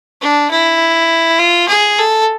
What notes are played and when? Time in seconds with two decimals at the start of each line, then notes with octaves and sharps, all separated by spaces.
0.21 D4
0.51 E4
1.39 F4
1.69 G#4
1.98 A4